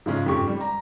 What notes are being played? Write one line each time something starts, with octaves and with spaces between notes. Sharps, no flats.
G#2 C#3 F3 G#3 C#4 F4
F2 G#2 C#4 G4 C#6
G3
A#5